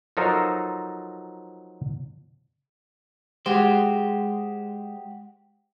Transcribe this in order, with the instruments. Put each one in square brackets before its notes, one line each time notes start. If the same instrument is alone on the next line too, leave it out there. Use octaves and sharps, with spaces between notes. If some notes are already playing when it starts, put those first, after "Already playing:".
[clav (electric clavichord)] F3 F#3 D#4 A4 A#4 C5
[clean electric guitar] G#3 C5 [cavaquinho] F#4 G4